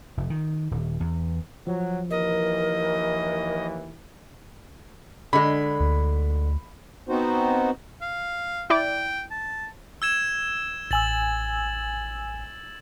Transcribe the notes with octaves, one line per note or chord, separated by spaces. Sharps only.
F1
D#3
D#1
E2
F3 F#3
D#2 E3 A#4 D#5
D3 G#3 B5
D2
B3 C4 D#4 F#4 C5
F5
E4 D5 G5
A5
E6 G#6 E7
A1 G#5 E6 A6 F#7